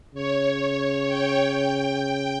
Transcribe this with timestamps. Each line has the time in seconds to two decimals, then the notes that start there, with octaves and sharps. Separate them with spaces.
0.15 C#3 C#5
0.45 C#5
0.77 C#5
1.08 G5
1.40 G5